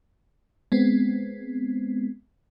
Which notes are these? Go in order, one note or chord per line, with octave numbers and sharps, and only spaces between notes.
G#3 B3 C4